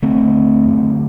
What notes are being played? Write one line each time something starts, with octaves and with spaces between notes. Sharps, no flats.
D2 D3 A3 C4
F#2 D3